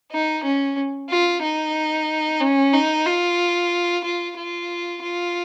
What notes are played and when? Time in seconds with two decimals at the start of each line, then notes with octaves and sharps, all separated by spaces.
0.11 D#4
0.44 C#4
1.09 F4
1.42 D#4
2.40 C#4
2.73 D#4
3.06 F4
4.04 F4
4.37 F4
5.02 F4